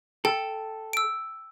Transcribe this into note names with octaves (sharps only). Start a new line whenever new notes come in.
A4 G5
E6 D7